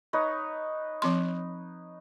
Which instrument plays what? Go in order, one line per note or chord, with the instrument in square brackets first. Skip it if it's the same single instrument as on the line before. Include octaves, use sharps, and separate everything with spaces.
[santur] D#4 B4 C#5
[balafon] F3 C4 C6